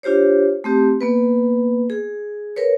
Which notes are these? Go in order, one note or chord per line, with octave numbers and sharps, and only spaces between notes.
D4 F4 G4 C5 C#5
A3 C4 G4
A#3 B3 B4
G#4
A#4 B4 C#5